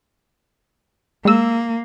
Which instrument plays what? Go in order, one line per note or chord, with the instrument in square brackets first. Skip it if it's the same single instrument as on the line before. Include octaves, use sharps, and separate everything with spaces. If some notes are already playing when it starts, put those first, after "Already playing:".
[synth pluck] G#3 E6 [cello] A#3